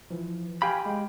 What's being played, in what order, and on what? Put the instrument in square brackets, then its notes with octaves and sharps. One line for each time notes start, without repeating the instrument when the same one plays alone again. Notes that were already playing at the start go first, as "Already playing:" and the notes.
[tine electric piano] E3 F3
[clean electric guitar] G4 B5 [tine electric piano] F5 G5 G#5
[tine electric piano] G#3 G5